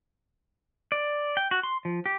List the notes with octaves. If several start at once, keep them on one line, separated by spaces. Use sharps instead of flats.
D5
G5
F#4
C6
F3
G4